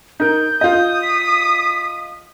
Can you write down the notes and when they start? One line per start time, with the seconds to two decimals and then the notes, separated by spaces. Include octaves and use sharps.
0.20 D#4 A#4 G6
0.61 F4 D#5 D#6
1.03 B6